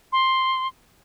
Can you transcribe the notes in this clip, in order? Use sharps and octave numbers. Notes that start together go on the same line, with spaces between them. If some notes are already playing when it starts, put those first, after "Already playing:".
C6